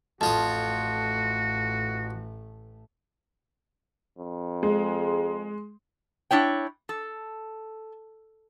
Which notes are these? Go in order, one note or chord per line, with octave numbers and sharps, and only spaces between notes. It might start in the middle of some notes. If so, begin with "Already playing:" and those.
A1 F2 A3 F4 F#4 A5 D#6
F2
G#3
D4 E4 C#5 G5
A4